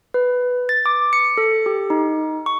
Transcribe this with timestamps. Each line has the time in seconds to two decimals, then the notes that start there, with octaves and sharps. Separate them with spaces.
0.14 B4
0.69 A6
0.86 D6
1.13 C#7
1.38 A4
1.66 G4
1.90 D#4
2.46 C#6